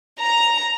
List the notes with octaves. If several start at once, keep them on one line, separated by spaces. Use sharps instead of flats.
A#5